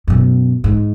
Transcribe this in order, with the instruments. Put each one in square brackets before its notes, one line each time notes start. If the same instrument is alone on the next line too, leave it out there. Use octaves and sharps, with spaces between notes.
[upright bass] F#2 B2
G#2